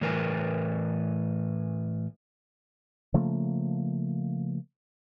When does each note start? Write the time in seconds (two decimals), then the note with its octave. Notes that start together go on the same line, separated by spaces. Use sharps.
0.01 A2 E3 A#4 B4 G#5
3.14 C#3 F3 A3 A#3